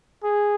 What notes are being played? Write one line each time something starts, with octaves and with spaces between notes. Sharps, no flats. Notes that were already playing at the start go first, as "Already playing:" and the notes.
G#4